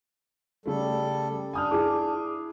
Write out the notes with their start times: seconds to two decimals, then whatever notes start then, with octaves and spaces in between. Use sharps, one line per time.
0.66 C#3 G3 A3 A4
1.53 D4 G#5 D#6 F6
1.71 E4 G#4 D6